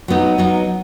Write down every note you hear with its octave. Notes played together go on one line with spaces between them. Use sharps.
F#3 B3 D#4
F#3 B3 D#4